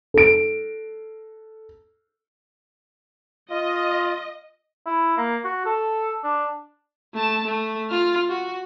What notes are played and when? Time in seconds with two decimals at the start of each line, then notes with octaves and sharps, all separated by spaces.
0.14 A4 D7
3.51 F4 D#5
4.86 E4
5.17 A#3
5.44 F#4
5.66 A4
6.24 D4
7.14 A3 A5
7.44 A3
7.90 F4 F6
8.30 F#4